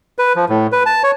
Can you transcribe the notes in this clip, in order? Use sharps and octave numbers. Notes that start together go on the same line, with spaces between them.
B4
F3
A2
B4
A5
C#5